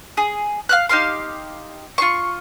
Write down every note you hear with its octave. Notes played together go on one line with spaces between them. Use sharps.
G#4
F5 F6 F#6
D#4 G4 F5 C6
F4 C6 C#6